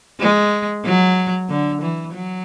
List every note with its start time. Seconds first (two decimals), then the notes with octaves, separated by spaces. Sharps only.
0.20 G#3
0.85 F#3
1.49 D3
1.82 E3
2.14 F#3